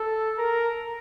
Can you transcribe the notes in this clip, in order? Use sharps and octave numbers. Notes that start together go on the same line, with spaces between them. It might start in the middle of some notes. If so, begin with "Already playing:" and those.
Already playing: A4
A#4